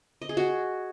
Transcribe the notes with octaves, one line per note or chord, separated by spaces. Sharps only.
D#5
G#4
F#4